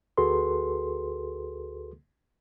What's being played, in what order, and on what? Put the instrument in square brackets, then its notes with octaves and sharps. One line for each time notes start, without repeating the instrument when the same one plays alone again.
[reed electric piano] D2 F#4 G#4 A4 B4 C6